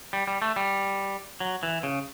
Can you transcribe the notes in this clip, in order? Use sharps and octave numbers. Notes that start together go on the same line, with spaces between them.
G3
G3
A3
G3
F#3
E3
C#3